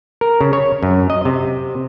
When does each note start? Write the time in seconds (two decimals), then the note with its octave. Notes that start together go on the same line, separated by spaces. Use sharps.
0.21 A#4
0.41 C#3
0.53 C#5
0.83 F#2
1.10 D#5
1.25 C3